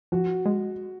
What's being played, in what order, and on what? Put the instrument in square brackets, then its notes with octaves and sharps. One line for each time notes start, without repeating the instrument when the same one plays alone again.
[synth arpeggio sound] F3 [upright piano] F#4
[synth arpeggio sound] G#3